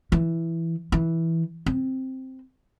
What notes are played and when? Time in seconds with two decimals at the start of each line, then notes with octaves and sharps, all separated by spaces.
0.12 E3
0.92 E3
1.66 C4